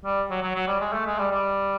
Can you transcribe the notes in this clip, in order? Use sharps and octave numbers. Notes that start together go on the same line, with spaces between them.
G3
F#3
F#3
F#3
G3
G#3
A3
G#3
G3
G3